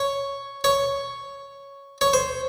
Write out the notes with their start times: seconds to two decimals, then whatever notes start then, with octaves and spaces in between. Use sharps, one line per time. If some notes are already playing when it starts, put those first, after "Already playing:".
Already playing: C#5
0.64 C#5
2.01 C#5
2.13 C5